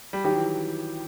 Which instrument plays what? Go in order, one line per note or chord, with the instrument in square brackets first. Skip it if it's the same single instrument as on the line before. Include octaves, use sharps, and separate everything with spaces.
[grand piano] G3
[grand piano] D#3 F#3 [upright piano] G4
[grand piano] E3